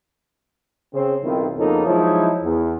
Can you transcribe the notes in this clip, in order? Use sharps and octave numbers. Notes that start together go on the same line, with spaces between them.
C#3 C4 C5
B1 D#3 C4 E4 F4
F2 C#3 A#3 B3 D#4 A4
F3 F#3 G#3 D#4 E4
E2